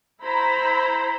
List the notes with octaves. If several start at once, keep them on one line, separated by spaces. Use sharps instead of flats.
E4 C5 A#5 B5